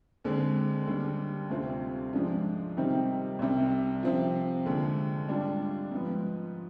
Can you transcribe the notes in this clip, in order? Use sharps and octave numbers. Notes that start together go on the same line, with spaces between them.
D#2 D3 G#3 C4
D#2 D3 G3
D2 C3 G3 C4 F4
G#2 F3 G#3 D4 F4
C3 D#3 G3 C4 D#4
C2 C3 G3
C3 F3 C4 F4
D#2 D3 G#3
G#2 G3 D4 F4
G#2 F3 B3